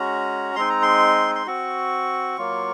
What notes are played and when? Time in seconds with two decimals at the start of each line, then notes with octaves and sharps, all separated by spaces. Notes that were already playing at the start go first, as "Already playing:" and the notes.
Already playing: G#3 C#4 F#4 A#5
0.56 G#3 C4 D#4 C6
0.70 A#5
0.82 C6
1.35 C6
1.46 C4 F#4 C#6
2.38 F#3 A#3 F4